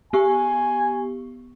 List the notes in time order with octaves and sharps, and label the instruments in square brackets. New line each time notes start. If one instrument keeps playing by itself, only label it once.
[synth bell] B3 G4 C#6 [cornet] G#5